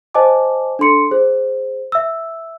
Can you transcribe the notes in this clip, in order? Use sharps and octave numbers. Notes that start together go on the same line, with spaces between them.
C5 D#5 G#5 A5 D6
D4 A4 C6 C#7
G#4 C5
E5 E6